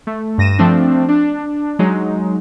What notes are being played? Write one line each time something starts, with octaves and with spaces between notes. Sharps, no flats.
A3
G2 A#6 D#7 E7
F3 A3 C4 D4
D4
F#3 G#3 D#4